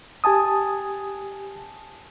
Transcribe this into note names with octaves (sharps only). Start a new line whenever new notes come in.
G4 G#5 A5 D#6